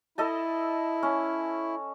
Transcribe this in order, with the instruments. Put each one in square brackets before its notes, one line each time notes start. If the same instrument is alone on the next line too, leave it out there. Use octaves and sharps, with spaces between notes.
[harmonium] E4 [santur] A4 D#5 A5
[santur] C#4